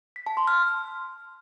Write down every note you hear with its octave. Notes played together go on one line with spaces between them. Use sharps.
B6
A5
C6
F6